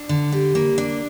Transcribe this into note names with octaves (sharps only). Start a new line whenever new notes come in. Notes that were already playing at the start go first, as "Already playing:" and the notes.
Already playing: D4
D3
G3
A#3
D4